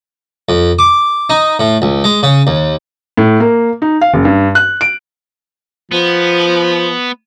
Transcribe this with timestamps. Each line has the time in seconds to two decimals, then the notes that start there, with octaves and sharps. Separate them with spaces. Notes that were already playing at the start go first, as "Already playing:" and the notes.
0.49 F2
0.79 D6
1.30 D#4
1.59 A2
1.82 C#2
2.04 G#3
2.23 C#3
2.47 D#2
3.17 A2
3.40 A#3
3.82 D#4
4.01 F5
4.14 F#1
4.25 G2
4.55 F#6
4.81 D7
5.92 F3 B3